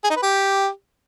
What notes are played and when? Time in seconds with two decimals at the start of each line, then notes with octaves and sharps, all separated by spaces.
0.04 G#4
0.10 D#4
0.16 B4
0.22 G4